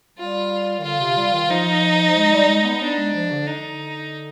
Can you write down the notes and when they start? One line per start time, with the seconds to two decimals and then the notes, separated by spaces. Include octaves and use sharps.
0.18 G3 F4
0.79 D#3
0.84 D3 F4
1.00 C3
1.17 G3
1.34 D#3
1.49 F3 D#4
2.15 G#3
2.32 G3
2.48 G#3
2.65 B3
2.81 B3 D4
2.98 G#3
3.14 F3
3.31 D3
3.47 D#4